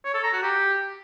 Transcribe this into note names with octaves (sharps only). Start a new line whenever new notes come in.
C#5
A4
A#5
F#4
G4